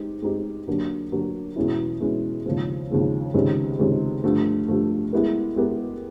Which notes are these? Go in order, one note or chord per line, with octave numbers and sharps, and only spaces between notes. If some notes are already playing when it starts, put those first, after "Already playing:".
Already playing: G#3 C4 D#4 G4
G#3 C4 D#4 G4
D3 F#3 A#3 D4 G4
D3 F#3 A#3 D4 G4
E2 B2 G#3 C#4 E4
E2 B2 G#3 C#4 E4
D#2 C#3 F3 G#3 C4
D#2 C#3 F3 G#3 C4
C#2 C3 D#3 G#3 C#4
C#2 C3 D#3 G#3 C#4
G2 D3 F3 A3
G2 D3 F3 A3
G#3 B3 E4 G4 A#4
G#3 B3 E4 G4 A#4